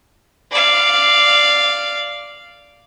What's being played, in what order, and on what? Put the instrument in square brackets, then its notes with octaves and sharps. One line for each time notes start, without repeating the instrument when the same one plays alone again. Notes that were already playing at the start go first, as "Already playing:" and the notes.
[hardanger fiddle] D5 F5